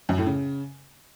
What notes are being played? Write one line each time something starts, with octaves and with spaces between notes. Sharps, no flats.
F#2
A2
C#3